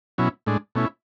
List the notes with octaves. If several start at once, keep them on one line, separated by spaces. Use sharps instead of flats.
B2 F#3 C#4 E4
A2 G#3 D4
B2 A3 C#4 E4